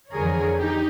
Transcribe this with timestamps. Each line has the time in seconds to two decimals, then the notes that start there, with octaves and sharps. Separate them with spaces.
0.12 F2 D3 E3 G#4 A#4 C#5
0.58 D#4 G4